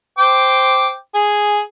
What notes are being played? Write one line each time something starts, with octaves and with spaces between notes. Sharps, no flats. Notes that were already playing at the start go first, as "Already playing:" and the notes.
C5 G5 D6
G#4